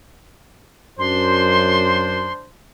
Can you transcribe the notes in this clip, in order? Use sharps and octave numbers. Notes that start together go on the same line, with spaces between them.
F#2 D4 C5 C6